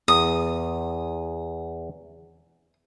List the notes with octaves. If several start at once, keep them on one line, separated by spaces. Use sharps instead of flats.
E2 D#6